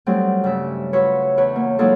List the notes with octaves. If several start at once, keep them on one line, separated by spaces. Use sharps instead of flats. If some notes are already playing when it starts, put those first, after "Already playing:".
F#3 G3 A3 C4 D4 D#4
G2 C#3 E5
F4 F#4 B4 C#5 E5
E2 B4 C#5
A#3
F#3 G#3 A#3 D#4 F4 A4